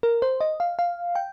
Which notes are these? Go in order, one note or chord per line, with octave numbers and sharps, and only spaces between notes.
A#4
C5
D#5
F5
F5
G5